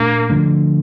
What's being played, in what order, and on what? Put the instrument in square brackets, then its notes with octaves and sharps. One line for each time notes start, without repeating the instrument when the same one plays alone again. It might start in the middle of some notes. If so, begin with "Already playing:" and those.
Already playing: [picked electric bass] A#2 A3 D4 [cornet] A#3
[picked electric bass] D3 F3 A3 D4